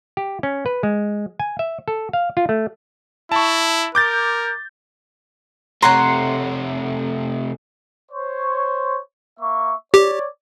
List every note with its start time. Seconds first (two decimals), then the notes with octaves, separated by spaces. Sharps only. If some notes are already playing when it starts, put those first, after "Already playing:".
0.17 G4
0.43 C#4
0.66 B4
0.83 G#3
1.40 G#5
1.59 E5
1.88 A4
2.13 F5
2.37 F4
2.49 A3
3.32 E4 A5 C#6
3.95 A#4 D6 G6 A6
5.82 C3 A3 C#5 F#5 A#5 C6
8.11 C5 C#5
9.40 A#3 E5 C#6
9.94 G4 C#5 D5